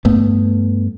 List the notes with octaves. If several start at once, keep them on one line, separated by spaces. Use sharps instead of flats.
G2 A3 B3